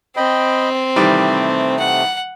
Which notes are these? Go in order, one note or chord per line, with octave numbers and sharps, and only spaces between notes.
C4 D#5 G5 B5
C3 D#3 E3 G3 A3
F#5